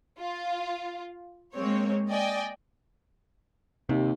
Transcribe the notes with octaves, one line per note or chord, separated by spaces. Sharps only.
F4
G#3 A#3 C4 C#5
D5 D#5 G5 G#5
D#2 C3